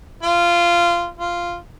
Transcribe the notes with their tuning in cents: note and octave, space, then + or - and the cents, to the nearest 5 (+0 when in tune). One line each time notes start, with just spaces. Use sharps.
F4 -15
F4 -5